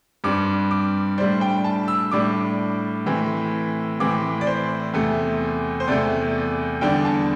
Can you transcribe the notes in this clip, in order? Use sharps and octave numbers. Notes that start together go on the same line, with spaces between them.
G2 G3 C4 D6
D6
A2 G3 D4 C5
G5
A5
E6
A2 G3 D4 D6
A2 E3 C4
A2 E3 C4 D6
D5
C5
E2 C3 A3
C5
E2 C3 A3 D5
E2 D3 G3 D4 G5
A5